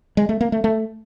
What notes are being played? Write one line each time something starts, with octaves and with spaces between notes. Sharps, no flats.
G#3
A3
A#3
A3
A3